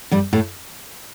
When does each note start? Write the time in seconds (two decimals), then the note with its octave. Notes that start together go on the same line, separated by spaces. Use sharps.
0.11 G2 G3
0.33 A2 A3